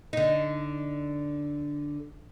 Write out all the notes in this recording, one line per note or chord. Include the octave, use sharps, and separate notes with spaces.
D3 D#4